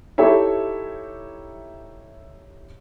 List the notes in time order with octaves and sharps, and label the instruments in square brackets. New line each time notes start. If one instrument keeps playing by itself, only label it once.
[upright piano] D#4 E4 G4 A4 C#5 E5